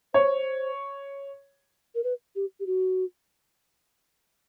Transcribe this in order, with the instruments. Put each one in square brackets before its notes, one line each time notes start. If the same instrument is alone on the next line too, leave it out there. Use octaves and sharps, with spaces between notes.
[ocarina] C5 [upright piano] C#5
[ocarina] A#4
B4
G4
G4
F#4